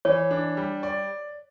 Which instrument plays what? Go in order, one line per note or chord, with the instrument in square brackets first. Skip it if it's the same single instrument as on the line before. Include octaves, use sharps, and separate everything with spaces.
[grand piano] E3 [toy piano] C#5
[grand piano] D4
G3
D5